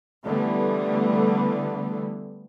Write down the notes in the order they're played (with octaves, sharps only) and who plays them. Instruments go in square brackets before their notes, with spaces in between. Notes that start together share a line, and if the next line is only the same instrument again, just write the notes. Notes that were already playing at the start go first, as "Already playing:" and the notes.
[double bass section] D3 E3 G3 A3 B3